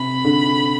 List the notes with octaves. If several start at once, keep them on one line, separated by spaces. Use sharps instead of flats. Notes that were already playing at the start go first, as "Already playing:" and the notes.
Already playing: C3 B5
D3